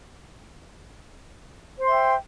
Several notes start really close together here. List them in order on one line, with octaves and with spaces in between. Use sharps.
C5 C6 E5 G5